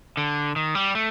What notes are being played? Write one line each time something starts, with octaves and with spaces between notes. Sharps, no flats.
D3
D#3
G3
A3